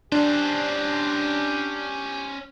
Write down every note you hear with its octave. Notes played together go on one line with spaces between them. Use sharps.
C#4 D4 G4 C5